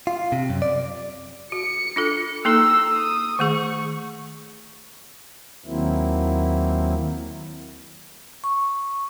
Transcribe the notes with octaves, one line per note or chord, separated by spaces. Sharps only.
F4
C3
F#2
D5
F#4 C#7
D4 F4 A4
A#3 D#4 A4 A#5 E6
D#6
D#3 A3 G#4 C#6
D#2 D#3 F#3 A#3 C4 E4
C#6